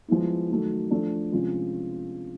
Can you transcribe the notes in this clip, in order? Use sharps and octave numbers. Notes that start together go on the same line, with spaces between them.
F3 G#3 B3 E4
D#3 F#3 A3
F3 A3 D4
C3 F3 G#3 C#4 F4